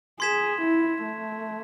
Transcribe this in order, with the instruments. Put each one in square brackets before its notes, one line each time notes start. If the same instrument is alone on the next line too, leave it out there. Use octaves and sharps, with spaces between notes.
[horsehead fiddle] G#4 [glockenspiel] C6 G#6 B6 E7
[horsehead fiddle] E4
A3